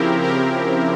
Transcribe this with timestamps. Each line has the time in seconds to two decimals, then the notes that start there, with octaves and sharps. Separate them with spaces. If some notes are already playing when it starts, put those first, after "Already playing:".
Already playing: C#3 F3 C4 E4 G4 A#4
0.23 G4 A#4